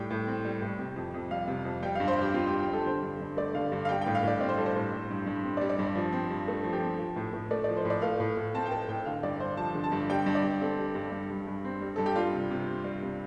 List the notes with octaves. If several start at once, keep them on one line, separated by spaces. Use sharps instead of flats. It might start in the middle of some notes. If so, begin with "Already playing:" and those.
Already playing: A2 G3 G5
A2
C4
G3
A2
C3
F2
F2
G3 F5
C3
F2
G3 G5
G2 F5
C5
G2 G4
C4 F4
G3 G4
G4
G2
A4
D3 C5
G2
G2
A3 D5
D3 F5
G2
F5
G3 G5
A2 G5
F5
A2 D5
C4 D5
C5
G3 A4
C5
A2
G3
G2
G2
C4
D5
G3
D5
G2
F3
C4
G2
A3 A4
F3
G4
C4
F3
A2
A2
A3 D5
F3 D5
C5
A2
D5
A3 F5
A2
A2
C4 A5
G5
A3 A5
A2 G5
D3 F5
G2 D5
G2 C5
F3 A5
D3
A5
G2
G3 G5
G2
D5
G2
C4 A4
G3
G2
G3
G2
G2
C4
G3
G2 A4
G4
G3 F4
C3
C3
C4
G3
C3